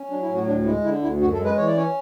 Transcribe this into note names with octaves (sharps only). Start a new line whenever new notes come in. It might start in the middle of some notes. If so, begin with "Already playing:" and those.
Already playing: C#4
F#3 D4
E4
A2
F#4
D2 D4
G#3 E4
D3 E4
D2 E4
F#2 F#4
A4
G#3
B4
E3 C#5
D5
C#4 C#5